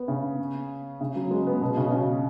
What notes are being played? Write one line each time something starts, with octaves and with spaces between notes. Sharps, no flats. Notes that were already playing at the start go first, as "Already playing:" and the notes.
Already playing: B3
C#3
C#3
F#3
G#3
C#4
B3
B2
C#3
B2
C#3